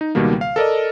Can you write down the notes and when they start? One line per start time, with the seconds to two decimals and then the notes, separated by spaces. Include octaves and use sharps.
0.01 D#4
0.15 C#2 B2 D#3 G3 A#3
0.41 F5
0.56 A4 A#4 D5 D#5